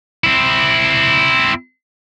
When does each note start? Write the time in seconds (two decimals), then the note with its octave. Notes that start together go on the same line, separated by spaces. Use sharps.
0.24 C4 E4